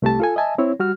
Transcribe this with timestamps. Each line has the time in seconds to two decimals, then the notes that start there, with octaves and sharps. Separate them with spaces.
0.02 C2 A3 G4 A5
0.20 F4 A4 G#5
0.36 D#5 E5 G#5 A5
0.58 C4 E4 C#5
0.80 G3 F#4 F6